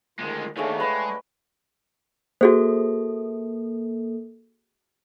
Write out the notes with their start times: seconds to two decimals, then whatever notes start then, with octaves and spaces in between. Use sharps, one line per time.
0.19 D2 D#3 G#3 F4
0.56 D#2 D3 D#3 A3 D4 G#4 C#5 F5
0.80 G#3 B4 E5 G5
2.41 A#3 F#4 G#4 A4 C5